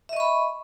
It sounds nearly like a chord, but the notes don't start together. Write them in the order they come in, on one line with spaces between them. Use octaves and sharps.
E5 D#5 C#6 B5